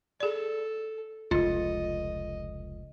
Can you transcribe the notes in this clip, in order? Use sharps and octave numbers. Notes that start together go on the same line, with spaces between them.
G#4 A4 D5
F1 C#2 F4 D#5